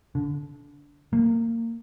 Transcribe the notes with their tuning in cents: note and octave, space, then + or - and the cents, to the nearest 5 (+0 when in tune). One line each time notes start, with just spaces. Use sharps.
D3 -20
A#3 -25